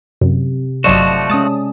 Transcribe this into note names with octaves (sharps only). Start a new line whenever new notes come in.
F#2 C3
G1 F3 F#3 A3 F#4 D5 D#5 E7
G#3 C#4 A5 D#6